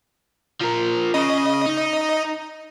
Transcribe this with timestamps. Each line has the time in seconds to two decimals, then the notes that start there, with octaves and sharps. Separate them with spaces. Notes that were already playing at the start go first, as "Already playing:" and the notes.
0.61 F3 A#4
1.14 C#3 D#5
1.66 D#4